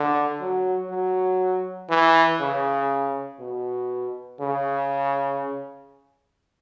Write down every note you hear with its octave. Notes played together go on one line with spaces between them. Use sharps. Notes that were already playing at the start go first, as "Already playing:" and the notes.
Already playing: D3
F#3
F#3
E3
C#3
B2
C#3